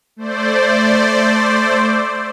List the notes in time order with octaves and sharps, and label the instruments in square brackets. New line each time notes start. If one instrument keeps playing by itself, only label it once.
[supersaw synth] A3 C5 D5